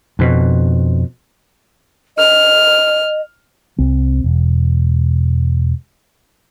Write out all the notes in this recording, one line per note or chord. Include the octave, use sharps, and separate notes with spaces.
F2 B2
D#5 F6
C2 C4
E1